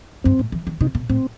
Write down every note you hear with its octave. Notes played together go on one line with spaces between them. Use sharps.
G2 C4
A2
E3
D#3
C3 D#4
B2
A2 C4